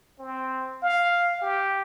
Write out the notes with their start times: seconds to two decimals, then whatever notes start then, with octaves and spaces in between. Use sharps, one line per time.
0.19 C4
0.83 F5
1.42 G4